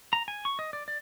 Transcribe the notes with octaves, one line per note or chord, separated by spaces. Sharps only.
A#5
G#5
C#6
D#5
D5
D5